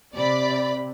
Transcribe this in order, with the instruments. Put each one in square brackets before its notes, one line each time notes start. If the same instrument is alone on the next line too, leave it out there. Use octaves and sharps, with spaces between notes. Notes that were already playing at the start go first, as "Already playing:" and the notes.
[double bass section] C3 [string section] D5 B5